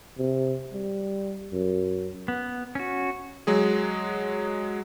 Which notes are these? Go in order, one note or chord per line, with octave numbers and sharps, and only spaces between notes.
C3
G3
F#2
B3
C#4 F#4
F#3 G#3 G#4